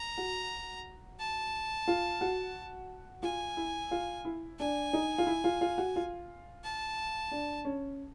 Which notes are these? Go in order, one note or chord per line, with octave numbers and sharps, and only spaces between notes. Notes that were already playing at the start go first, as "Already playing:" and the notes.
Already playing: A#5
F#4
A5
F4
F#4
F4 G#5
E4
F4
E4
D4 G#5
D#4
F4
E4
F4
F4
F#4
F4
A5
D4
C#4